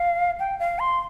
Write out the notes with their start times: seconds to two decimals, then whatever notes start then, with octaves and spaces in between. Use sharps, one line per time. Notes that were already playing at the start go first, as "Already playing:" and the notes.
Already playing: F5
0.39 G5
0.59 F5
0.79 C6